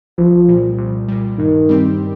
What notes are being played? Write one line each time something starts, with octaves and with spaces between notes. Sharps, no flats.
C2 F3
A#2 G3
C2
A#2 G3
G2 D#3
G3 C4 G4